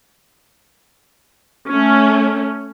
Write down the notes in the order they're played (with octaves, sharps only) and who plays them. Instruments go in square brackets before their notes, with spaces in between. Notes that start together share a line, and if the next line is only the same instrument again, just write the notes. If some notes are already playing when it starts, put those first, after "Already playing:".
[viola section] A3 C#4